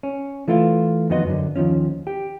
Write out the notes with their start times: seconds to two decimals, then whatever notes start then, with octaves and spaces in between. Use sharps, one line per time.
0.03 C#4
0.48 E3 A3 E4 F4
1.10 F2 D#3 B3 F#4 D#5 C6
1.26 F#2 D3
1.56 D#2 D#3 F3 C#4
2.07 G4